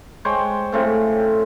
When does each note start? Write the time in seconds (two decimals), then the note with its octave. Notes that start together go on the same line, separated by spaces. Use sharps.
0.25 G#3 C5 C#5 G5
0.72 A2 C#3 A3 C4